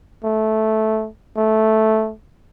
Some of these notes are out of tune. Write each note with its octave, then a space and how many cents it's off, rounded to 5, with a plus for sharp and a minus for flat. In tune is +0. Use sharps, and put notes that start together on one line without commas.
A3 -10
A3 -5